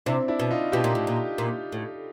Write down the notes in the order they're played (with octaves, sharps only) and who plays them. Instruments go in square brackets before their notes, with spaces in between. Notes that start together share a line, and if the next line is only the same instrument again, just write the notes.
[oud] C3 [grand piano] D4 E4
[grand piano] D4 E4
[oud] B2
[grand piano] D#4 F4
[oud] B2 [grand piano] F4 G4
[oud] A#2
A2
A#2
A#2
A2